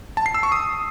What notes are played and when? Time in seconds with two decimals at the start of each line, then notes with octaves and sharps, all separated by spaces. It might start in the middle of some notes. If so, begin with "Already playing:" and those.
0.17 A5
0.26 C7
0.34 E6
0.43 C#6
0.52 D#6